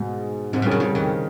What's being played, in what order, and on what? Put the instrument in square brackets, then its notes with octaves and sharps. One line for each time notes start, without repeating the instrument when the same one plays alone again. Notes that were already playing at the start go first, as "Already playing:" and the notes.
Already playing: [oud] G#2 [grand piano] B2
[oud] G#2 [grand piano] C3
[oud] G2
[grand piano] C#3
[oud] F#2
[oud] G2 [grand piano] C#3
[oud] F2 [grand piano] D#3